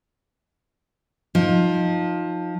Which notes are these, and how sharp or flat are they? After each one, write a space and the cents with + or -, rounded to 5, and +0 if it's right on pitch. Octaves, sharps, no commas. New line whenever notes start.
F3 +15 D#4 +0